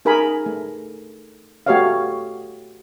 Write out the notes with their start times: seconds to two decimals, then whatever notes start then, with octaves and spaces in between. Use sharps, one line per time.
0.05 D#4 G#4 A#4 G#5 B5
0.46 A3
1.66 A3 F#4 G4 C#5 D#5 F5